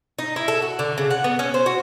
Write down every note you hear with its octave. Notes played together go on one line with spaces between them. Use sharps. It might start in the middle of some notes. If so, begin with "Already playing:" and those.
D#4
E4
A4
F#4
D3
C#3
F#5
B3
C#4
C5
F#4